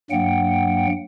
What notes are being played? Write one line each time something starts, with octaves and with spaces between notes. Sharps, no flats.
G2 F#3 A#3 F#5 G5